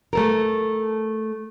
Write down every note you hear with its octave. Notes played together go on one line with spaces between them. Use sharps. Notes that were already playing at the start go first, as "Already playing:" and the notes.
A3 A4 A#4